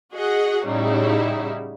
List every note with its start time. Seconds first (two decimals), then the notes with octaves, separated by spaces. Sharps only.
0.13 F#4 G#4 D#5 F#5
0.65 A2 C#3 F#3 G3 D#4 E4